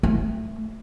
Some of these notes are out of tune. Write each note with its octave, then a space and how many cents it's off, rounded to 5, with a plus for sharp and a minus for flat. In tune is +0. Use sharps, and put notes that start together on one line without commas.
A3 +0